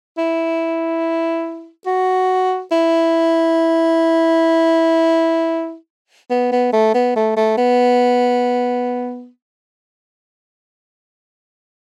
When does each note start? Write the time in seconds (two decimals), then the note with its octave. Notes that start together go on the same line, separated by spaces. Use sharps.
0.18 E4
1.86 F#4
2.71 E4
6.30 B3
6.52 B3
6.73 A3
6.94 B3
7.16 A3
7.37 A3
7.57 B3